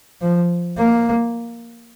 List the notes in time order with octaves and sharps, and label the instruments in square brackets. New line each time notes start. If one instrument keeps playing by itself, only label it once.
[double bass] F3
A#3